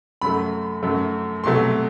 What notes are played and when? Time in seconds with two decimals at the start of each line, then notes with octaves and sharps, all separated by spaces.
0.21 F#2 F#3 A3 B5
0.83 F#2 F#3 A3
1.44 C2 B2 F#3 A3 C6